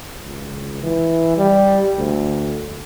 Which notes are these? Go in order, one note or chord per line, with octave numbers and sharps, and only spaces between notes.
C#2
E3
G3
D2